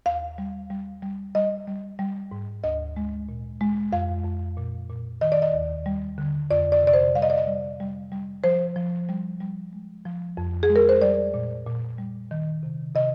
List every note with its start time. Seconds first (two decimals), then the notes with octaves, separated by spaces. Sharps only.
0.06 D#2 F5
0.38 G3
0.70 G3
1.02 G3
1.35 G3 D#5
1.67 G3
1.99 G3
2.32 G#2
2.64 D2 D#5
2.96 G#3
3.29 A#2
3.61 G#3
3.92 F2 F5
4.25 F2
4.57 A#2
4.89 A#2
5.21 D#3 D#5
5.32 D5
5.42 D#5
5.54 D#2
5.86 G3
6.18 D3
6.51 F2 D5
6.72 D5
6.83 C3 D5
6.93 C5
7.15 G3 F5
7.22 D#5
7.30 D5
7.38 D#5
7.47 G3
7.80 G3
8.12 G3
8.44 F3 C5
8.76 F3
9.09 G3
9.41 G3
9.73 G#3
10.05 F3
10.37 F2
10.63 G#4
10.70 G#3
10.76 A#4
10.89 C5
11.02 G3 D5
11.34 A#2
11.66 A#2
11.98 G3
12.31 D#3
12.63 C3
12.95 C3 D#5